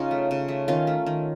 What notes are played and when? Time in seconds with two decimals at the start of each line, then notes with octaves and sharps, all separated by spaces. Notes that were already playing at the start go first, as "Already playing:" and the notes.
Already playing: C#3 C#4 D#4 F4
0.11 A3
0.31 C#3
0.48 A3
0.68 D#3 C#4 F4
0.87 A3
1.06 D#3